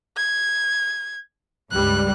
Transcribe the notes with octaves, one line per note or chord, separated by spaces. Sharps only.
G#6
C#2 G2 G3 F#6